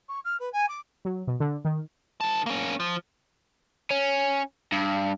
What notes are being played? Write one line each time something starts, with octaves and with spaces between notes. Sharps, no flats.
C#6
F6
B4
G#5
D6
F#3
B2
D3
D#3
D#3 A5
A#3 C#4
F3
C#4
G2